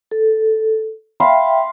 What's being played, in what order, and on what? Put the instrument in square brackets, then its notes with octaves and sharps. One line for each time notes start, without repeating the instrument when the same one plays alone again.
[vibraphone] A4
[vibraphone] E5 G5 [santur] F5 B5 C6